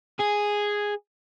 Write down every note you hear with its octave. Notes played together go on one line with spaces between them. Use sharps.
G#4